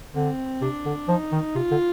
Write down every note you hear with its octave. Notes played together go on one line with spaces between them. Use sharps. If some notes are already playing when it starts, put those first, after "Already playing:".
D3 C4
C3 D4
D3
F3 D#4
D#3
C3 F4
D3